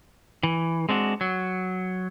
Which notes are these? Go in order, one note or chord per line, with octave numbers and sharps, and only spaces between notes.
E3
G#3 C4 D4 F#4
F#3